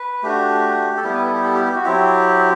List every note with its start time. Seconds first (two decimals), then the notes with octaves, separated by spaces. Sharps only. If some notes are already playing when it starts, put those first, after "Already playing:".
Already playing: B4
0.23 A3 D4 F#4 G4
0.97 A4
1.04 G3 B3 E4 G4
1.14 B4
1.25 A4
1.34 G4
1.44 A4
1.55 G4
1.65 G4
1.75 F#4
1.84 F#3 C4 E4 G4